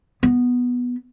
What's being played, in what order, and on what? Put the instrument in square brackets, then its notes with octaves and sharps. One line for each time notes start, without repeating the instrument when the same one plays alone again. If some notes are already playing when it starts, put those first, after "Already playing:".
[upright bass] B3